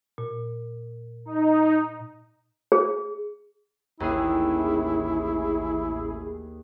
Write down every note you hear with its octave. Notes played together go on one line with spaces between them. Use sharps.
A#2
D#4
G#4
A1 D#2 E4 G#4